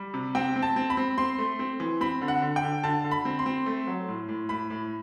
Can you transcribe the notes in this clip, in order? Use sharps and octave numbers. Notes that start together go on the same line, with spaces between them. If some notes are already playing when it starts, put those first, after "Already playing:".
Already playing: G3
C3
C4 G5
C4
A5
C4
B5
C4
C4 C6
A3
C4
E3
C4 B5
D3
F#5
D3
G5
D3
D3 A5
D3
B5
C4
C6
C4
A3
F#3
A2
A2
A2 B5
A2